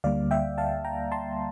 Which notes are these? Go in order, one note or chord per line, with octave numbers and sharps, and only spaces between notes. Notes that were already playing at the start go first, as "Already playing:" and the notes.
D2 D3 G3 A#3 D5 F5
E5 G5
F5 A5
G5 A#5
A5 C6